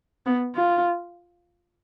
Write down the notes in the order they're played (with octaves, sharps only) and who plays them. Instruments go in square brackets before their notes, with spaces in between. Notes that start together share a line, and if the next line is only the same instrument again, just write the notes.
[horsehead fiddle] B3
F4